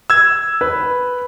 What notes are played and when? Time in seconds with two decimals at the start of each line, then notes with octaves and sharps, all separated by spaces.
0.10 E6 G#6
0.61 B4